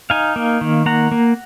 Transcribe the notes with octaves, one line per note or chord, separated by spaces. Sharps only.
D#4 F5 G#5
A#3
D#3
A#3 F#5 A#5
A#3